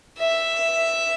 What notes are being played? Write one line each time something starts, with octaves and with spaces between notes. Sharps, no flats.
E5